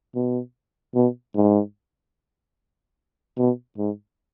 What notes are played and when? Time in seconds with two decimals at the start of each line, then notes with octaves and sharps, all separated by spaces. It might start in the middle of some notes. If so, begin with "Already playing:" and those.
0.15 B2
0.95 B2
1.35 G#2
3.38 B2
3.78 G#2